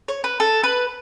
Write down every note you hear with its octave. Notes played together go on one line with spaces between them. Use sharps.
C#5
B4
A4
B4